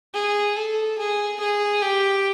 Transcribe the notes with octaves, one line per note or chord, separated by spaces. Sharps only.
G#4
A4
G#4
G#4
G4